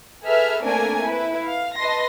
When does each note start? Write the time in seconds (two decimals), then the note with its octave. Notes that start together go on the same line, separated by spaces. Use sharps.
0.24 G#4 A4 B4 E5 F6
0.63 A3 A#3 C4 D4 A#4 G#5
1.03 E4 B4
1.44 F5
1.78 B4 D#5 A5 C6 A#6